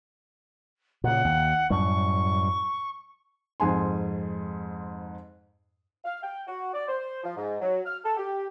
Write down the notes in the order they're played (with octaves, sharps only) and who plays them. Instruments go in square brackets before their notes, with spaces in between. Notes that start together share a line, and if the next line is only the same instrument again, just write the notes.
[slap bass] A#2 C#3 [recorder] F#5
[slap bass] D#2
[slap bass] F#2 A2 G3 [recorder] C#6
[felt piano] F2 G#2 G#5 C6
[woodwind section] F5
G5
F#4
D5
C5
F3
G#2
F#3
F6
A4
G4